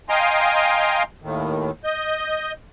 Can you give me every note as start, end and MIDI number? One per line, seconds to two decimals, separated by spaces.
0.09 1.03 75
0.09 1.03 77
0.09 1.03 79
0.09 1.03 80
0.09 1.03 82
0.09 1.03 84
1.22 1.71 39
1.22 1.71 45
1.22 1.71 51
1.84 2.53 75
1.84 2.53 91